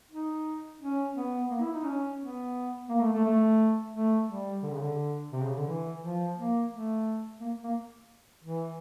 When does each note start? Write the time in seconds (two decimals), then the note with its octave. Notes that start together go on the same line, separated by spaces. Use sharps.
0.12 D#4
0.81 C#4
1.16 B3
1.50 A#3
1.61 E4
1.73 D#4
1.85 C#4
2.19 B3
2.89 A#3
3.01 A3
3.13 A3
3.24 A3
3.93 A3
4.28 G3
4.63 D3
4.71 C#3
4.79 D3
5.32 C3
5.43 C#3
5.55 D3
5.67 E3
6.01 F3
6.36 A#3
6.71 A3
7.40 A#3
7.64 A#3
8.44 E3